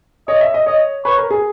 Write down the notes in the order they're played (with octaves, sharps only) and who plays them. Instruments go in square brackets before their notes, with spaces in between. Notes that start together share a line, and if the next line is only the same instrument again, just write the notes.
[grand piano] C#5 [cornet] D#5
[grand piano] E5
D#5
[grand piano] C#5 [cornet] D#5
[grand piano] B4 [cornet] C#5
[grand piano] A#4
G#4